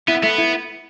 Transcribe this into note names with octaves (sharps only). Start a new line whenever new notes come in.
B3 E4
A3 B3
E4